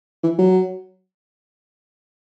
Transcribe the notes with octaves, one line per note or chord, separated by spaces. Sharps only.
E3
F#3